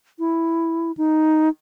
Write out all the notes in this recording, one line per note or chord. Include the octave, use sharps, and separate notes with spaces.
E4
D#4